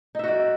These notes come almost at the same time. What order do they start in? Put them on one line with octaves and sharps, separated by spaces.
D#4 E5 F#4 D5